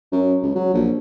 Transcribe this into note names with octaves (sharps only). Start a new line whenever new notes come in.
F#2
C#2
F#3
A#1